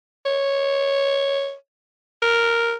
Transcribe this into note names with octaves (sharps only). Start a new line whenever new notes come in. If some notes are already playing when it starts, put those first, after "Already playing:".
C#5
A#4